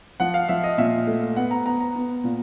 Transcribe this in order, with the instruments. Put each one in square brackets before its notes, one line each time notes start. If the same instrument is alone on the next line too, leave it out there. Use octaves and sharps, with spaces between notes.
[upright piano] F3 [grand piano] F#5
[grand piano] F5
[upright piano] F3 [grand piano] E5
[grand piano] D#5
[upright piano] A#2 [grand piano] E5
[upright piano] A3
[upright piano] B3 [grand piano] F#5
[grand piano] A#5
[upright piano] B3 [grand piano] A#5
[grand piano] A#5
[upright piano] B3
A#2